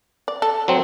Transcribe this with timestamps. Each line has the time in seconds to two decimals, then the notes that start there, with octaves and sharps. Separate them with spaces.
0.28 D5
0.42 A4
0.68 F#3 C4